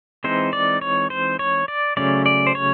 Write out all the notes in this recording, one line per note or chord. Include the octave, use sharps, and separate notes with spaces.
E3 G#3 C4 D#4 C5
D5
C#5
C5
C#5
D5
C#3 F#3 A3 C#4 D5
D5
C5
C#5